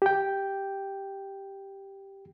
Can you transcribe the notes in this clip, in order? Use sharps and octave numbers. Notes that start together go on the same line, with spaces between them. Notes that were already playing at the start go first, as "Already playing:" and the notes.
G4 G5